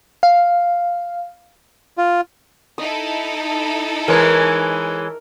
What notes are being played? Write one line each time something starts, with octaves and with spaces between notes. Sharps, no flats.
F5
F4
D#4 E4 A4 D#6
E3 G#3 A#4 C#5